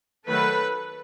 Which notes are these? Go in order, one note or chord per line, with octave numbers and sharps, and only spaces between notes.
D#3 F#3 A3 A4 B4